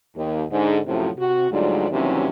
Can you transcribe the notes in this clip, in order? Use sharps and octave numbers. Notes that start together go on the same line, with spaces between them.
D#2
G#2 D3
F#2 A2 C3 F3 F#3
C3 F#4
D2 G#2 F#3 G3 F4 D5
D#2 C3 E3 F#3 G3 C#4